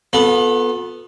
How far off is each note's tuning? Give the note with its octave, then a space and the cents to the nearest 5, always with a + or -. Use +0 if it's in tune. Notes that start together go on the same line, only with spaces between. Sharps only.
B3 +0 F4 +45 A4 +0